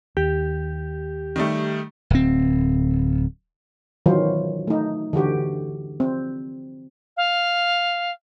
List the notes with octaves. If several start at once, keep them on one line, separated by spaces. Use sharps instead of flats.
D#2 G4
D#3 G3 A3
D1 C4
D#3 E3 F#3 F4 C5
A3 D#4
D3 E3 F#4 G4
C4
F5